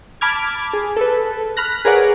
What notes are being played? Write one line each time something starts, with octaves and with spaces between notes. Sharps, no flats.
A5 B5 D6 F6 G#6
G#4
A4 B4
B5 F6 F#6 A#6
G#4 A#4 B4 C#5 D5 F#5